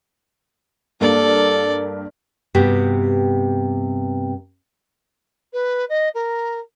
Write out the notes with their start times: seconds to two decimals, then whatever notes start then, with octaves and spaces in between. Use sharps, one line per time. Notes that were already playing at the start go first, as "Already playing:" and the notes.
1.01 G2 A#3 A4 D5
2.54 G2 C3 B3 F#4 G4
5.53 B4
5.89 D#5
6.14 A#4